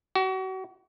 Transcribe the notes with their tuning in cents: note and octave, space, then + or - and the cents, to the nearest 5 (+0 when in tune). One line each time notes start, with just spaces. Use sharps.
F#4 +35